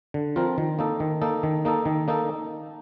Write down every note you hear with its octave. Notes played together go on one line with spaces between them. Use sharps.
D3
F3 C4 F4 A#4
D#3
A#3 D#4 A4
D#3
A#3 D#4 A4
D#3
A#3 D#4 A4
D#3
A#3 D#4 A4